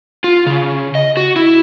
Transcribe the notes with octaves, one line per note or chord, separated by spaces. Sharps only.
F4
C#3
D#5
F#4
E4